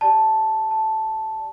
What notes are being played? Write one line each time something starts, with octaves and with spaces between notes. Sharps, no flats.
G4 D5 A5
A5